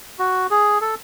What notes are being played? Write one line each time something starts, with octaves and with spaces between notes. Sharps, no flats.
F#4
G#4
A4